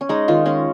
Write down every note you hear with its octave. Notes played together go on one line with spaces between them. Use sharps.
C#4
G#3 D#4
D#3 F4
G#3 C#4